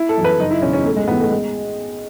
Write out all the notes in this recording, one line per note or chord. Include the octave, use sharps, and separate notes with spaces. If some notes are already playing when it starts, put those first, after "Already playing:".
Already playing: E4
A4
F#2 E3
B4
F#1 D#4
E4
E2 C#3 C#4
C#4
B1 A3
G#3
A2 E3 B3
A3
G#3